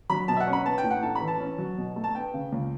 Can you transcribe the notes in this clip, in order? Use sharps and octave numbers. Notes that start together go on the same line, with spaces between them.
F#3 B5
B2 A5
E5
F#5
C#4
B5
B3 A5
G5
A2
F#5
A1 A5
B5
E3
A5
C#4
F#3
B2
A3
A5
B3 G5
C#3
C#2